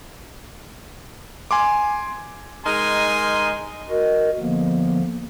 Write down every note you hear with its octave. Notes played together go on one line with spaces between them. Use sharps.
G#5 C6 D6
G#3 D#4 A#4 G#5 C6
F#4 A#4 D#5
D3 F3 A#3 B3